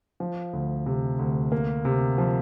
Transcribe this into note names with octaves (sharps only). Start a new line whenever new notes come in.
F3
D2
C3
D2
A#3
C3
F3